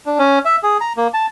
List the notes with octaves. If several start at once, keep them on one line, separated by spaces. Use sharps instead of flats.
D4
C#4
E5
G#4
A#5
A#3
A5